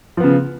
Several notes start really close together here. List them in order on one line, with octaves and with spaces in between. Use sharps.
F3 B3 C#3